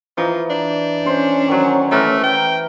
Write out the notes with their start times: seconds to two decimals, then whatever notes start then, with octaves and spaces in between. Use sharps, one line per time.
0.17 E3 F3 D#4
0.50 D4
1.06 C#4 C5
1.48 D#3 F#3
1.91 E3 A3 A#4 B4
2.23 G5